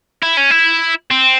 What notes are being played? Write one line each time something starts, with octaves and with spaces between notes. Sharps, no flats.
E4
C#4
E4
C4